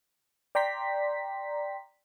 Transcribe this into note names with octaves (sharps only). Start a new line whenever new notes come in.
D5 G5 A#5 C6 B6